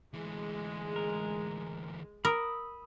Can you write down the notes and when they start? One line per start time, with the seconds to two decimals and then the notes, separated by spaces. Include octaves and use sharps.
0.13 D2 E3 G#3
0.96 A#4
2.25 A#4 B5 D#6 E6